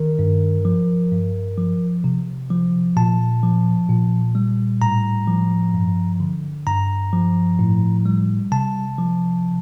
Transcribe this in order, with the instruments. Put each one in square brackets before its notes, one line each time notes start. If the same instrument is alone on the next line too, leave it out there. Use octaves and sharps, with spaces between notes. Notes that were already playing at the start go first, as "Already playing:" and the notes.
Already playing: [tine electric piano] D#3 A#4
G2
F3
G2
F3
C3
F3
A#2 A5
F3
A#2
G3
A2 A#5
F3
G2
D3
G2 A#5
F3
A2
G3
C3 A5
F3